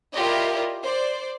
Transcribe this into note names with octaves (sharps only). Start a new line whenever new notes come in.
E4 F4 G4 A#4 D5 D#5
C5 D5